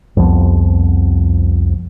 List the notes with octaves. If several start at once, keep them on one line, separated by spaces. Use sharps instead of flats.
C2 F2 F3 B3